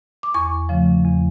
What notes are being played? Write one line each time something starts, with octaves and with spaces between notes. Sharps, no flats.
D6
E2 C#6
C#3 F3 A3
E2